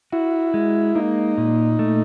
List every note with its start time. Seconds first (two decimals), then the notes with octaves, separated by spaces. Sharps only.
0.12 E4 F#4
0.54 G#3
0.95 A#3 D#4
1.38 A#2
1.79 A3